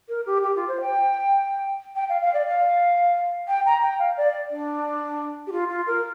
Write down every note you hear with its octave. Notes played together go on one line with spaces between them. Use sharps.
A#4
G4
G4
F4
C5
G5
G5
F5
F5
D5
F5
G5
A#5
G5
F5
D5
D4
G4
F4
F4
A#4